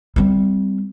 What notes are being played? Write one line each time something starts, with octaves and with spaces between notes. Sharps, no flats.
G3 C4